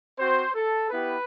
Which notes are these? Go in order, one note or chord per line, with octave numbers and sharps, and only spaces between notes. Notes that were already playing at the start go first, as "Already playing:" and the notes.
C4 F#4 C5
A4
B3 E4 G4 B4